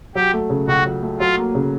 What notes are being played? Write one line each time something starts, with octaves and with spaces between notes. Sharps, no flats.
F#3 G4
A3
C#3
C#2 F#4
F#3
A3
F#3 F4
A#3
C#3